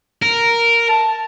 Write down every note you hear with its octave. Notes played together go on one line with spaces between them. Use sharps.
A#4
A5